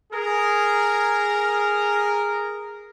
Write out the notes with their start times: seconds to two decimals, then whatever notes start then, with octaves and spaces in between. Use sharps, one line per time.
0.12 G#4 A#4